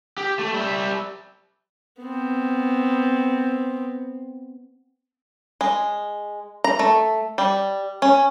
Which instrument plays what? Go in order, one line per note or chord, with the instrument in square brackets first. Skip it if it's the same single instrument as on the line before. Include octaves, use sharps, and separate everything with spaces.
[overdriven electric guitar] G4
A3
G3 E5
[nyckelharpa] B3 C4
[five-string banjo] G#3
A#5
A3
G3
C#4